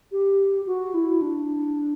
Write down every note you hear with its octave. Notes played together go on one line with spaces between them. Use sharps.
G4
F#4
E4
D4